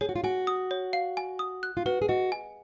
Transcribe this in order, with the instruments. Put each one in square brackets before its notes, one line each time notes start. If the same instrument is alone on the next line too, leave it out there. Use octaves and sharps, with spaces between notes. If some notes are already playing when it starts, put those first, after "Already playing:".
[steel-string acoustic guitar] G#4 [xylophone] C#5
[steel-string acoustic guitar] F#4
F4
[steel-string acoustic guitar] F#4 [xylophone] G#5
[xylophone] D#6
C#5
F5
G#5
D#6
F#6
[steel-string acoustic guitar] F4
[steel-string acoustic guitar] F#4 [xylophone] B4
[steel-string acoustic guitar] G#4
[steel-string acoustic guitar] F#4 [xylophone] D#5
[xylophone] G#5